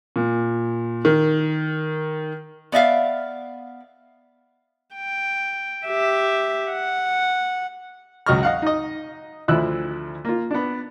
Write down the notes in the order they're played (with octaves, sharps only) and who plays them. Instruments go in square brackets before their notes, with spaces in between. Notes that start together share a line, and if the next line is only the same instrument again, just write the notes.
[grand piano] A#2
D#3
[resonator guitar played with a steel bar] B3 D5 E5 F5
[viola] G5
G4 E5
F#5
[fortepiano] C#2 F#3 D#5 C#6 F6
D#5 F5 F#5
D#4 D#5
D2 F3 E4 E6 F#6
A#3 F4
B3 D4